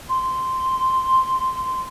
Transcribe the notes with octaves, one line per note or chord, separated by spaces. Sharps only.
C6